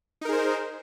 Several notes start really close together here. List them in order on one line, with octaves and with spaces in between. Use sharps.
D#4 A#4 G#4 C5